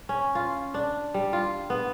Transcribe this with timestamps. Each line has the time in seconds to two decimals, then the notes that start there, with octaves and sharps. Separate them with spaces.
0.09 C#4
0.35 F4
0.74 D4
1.14 G3
1.33 F4
1.70 B3